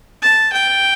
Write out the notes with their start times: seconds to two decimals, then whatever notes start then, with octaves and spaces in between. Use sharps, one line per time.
0.22 A5
0.53 G5